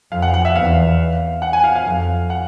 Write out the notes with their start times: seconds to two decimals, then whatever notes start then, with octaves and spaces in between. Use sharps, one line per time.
0.12 F2 F5
0.22 F#5
0.34 F#5
0.45 E5
0.55 E2 F5
1.42 F#5
1.53 G#5
1.64 F5
1.76 F5
1.87 F2
2.30 F#5